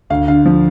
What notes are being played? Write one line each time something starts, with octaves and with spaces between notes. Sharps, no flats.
D2 F5
D3 F5
F3